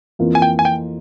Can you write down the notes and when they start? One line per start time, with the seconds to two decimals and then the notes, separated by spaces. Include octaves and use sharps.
0.19 F2 E3 A#3 F4
0.35 G#5
0.42 G5
0.59 G#5
0.65 G5